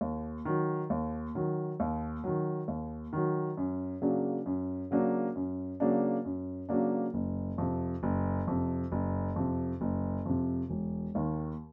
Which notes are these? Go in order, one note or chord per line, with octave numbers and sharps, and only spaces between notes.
D#2
D#3 F#3
D#2
D#3 F#3
D#2
D#3 F#3
D#2
D#3 F#3
F#2
C#3 F#3 A#3 D4
F#2
C#3 F#3 A#3 D4
F#2
C#3 F#3 A#3 D4
F#2
C#3 F#3 A#3 D4
F#1
F2 C3
F#1
F2 C3
F#1
F2 C3
F#1
F2 C3
E1
D#2 D#3